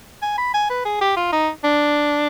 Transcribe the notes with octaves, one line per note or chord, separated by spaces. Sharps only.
G#5
B5
G#5
B4
G#4
G4
F4
D#4
D4